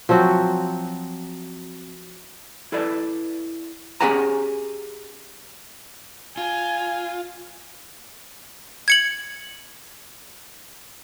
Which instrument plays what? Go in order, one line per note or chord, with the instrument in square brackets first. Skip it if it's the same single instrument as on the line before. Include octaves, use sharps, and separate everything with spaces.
[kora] F3 F#3 C4 F#4
[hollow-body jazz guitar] E4 A4 B4 D5 E5
C#4 G4 G#4 F#5 G#5 A#5
[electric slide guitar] F4 [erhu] G#5
[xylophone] G#6 C#7 F#7